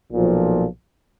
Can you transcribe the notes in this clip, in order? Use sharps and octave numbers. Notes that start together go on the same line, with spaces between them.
B1 A#2 F3